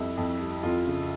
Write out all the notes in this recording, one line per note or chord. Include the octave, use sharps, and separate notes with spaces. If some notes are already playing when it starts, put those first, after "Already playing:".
Already playing: F2 G3 E4
F2
G3
F2 F4
C#3